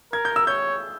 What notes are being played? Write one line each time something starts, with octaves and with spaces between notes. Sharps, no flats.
A#4 G#6
G6
E6
C#5 G6